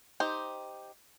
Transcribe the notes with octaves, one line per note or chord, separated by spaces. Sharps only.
D#4 G4 C5